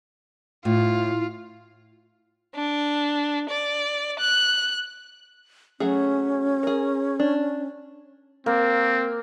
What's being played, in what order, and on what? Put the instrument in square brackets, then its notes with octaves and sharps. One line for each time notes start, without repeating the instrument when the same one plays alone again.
[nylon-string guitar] A2 [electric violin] F4
[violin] D4
D5
F#6
[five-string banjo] F#3 A3 G#4 [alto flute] C#4
[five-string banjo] G#4 A#4
D4
[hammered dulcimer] A#3 [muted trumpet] C4